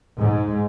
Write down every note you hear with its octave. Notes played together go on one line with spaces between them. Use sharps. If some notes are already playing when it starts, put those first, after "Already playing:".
G#2